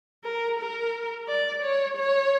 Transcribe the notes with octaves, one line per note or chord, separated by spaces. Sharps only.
A#4
A#4
D5
C#5
C#5